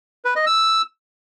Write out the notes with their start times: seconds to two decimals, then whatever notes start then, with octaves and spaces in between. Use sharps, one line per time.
0.25 B4
0.36 D#5
0.47 E6